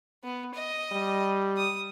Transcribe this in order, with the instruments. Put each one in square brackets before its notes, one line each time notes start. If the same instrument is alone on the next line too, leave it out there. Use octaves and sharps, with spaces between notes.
[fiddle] B3
D#5
[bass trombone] G3
[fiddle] D#6